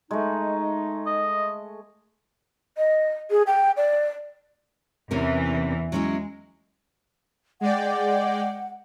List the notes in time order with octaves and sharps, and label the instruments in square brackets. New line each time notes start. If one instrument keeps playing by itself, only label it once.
[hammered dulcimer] G#3 A3 [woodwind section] D#4
[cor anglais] D#5
[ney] D#5
G#4
G5
D5
[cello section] E2 E3 [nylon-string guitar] C3 C#4 A#4
[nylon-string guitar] F#3 C#4 E4 [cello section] G#3
[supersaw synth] G#3 D5 G5 [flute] F#5